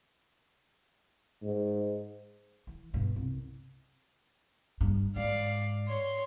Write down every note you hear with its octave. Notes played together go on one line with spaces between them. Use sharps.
G#2
E3
G2 B2
C2
G2
G#2 D5 F5
C#5 C6